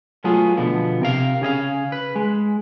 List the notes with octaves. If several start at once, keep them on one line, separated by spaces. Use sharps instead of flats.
F#3 A3 B3 F4 G#4
B2 D3 F3 B3
C3 A#4 F5
C#3 G#4 D#5 F5
B4
G#3